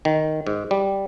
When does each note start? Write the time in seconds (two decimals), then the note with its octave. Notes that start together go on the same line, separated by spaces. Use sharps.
0.05 D#3
0.47 G#2
0.71 G3